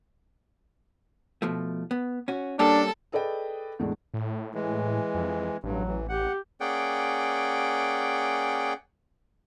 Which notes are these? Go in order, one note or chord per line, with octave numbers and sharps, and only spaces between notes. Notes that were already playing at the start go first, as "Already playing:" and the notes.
B2 F3 A3
B3
C#4 F#4
G3 A#3 C#4 D4 A4
G#4 A4 B4 D5 D#5 G5
E2 A2 G#3 D4
A2
E3 G#3
F2
A1 G2 F#3
E3
G4 F#5
A#3 C#4 G#4 D5 F#5 G5